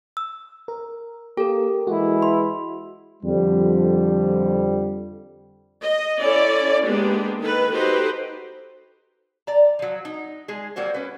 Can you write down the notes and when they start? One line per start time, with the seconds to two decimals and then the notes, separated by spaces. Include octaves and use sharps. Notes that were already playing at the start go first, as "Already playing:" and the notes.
0.17 E6
0.68 A#4
1.37 A#3 G4 A4 A#4
1.87 E3 G#3 E4 F#4
2.22 C6
3.23 F2 D3 G3
5.82 D#5
6.20 C#4 E4 A4 C#5 D5
6.85 G#3 A#3 B3 D4 G4
7.39 D#3 A4 B4
7.72 D#4 F#4 G4 A4 B4 C5
9.47 D5 A#5
9.79 F3 F#3
10.05 D#4
10.48 G#3 G#4
10.76 F#3 G3 A#3 F#4 C5
10.94 C#4 B4